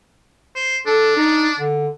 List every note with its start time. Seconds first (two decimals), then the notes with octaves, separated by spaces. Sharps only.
0.56 C5
0.86 D4 A4
1.16 D#4
1.59 D3